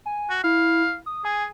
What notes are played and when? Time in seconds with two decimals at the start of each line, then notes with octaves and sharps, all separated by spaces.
0.06 G#5
0.30 F#4
0.44 E4 F5
1.06 D#6
1.25 G#4 G#5